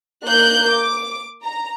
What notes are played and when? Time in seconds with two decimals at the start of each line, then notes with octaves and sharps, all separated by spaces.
0.25 A#3 F#6 G6
0.73 D6
1.43 A#5